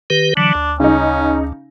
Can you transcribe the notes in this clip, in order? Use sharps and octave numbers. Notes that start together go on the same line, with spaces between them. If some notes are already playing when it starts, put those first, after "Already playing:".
D#3 G4 B4
D3 E3 F#3 D4
D2
C#3 C#4 D#4